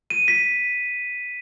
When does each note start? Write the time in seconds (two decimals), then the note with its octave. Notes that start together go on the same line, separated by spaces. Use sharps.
0.10 D#7
0.28 B6